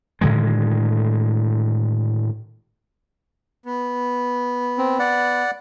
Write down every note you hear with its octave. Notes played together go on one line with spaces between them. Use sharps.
A2 D3 D#3 G#3
B3
C4
D5 F#5